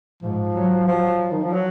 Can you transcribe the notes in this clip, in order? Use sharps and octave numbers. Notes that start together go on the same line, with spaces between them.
G#2 F3
F#3
F3 F#3
D#3
F3
F#3